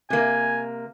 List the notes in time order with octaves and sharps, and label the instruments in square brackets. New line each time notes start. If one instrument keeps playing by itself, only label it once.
[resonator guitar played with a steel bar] C3 A#3 [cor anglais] G#5